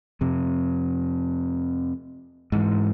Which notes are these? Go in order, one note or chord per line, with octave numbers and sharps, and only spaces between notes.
F2 C3
G#2 E3